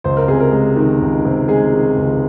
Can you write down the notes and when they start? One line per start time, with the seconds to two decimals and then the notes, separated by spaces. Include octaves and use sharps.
0.04 C#2 C5
0.17 A#4
0.28 C3 G#4
0.40 A#4
0.52 G#3
0.76 D#3
1.01 C#2
1.25 C3
1.48 G#3 G#4
1.73 D#3
1.97 C#2